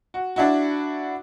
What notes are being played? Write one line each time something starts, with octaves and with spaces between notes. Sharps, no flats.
F#4
D4 E4 F#4